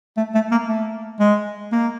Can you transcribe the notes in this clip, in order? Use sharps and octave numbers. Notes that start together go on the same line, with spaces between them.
A3
A3
A#3
A3
G#3
A#3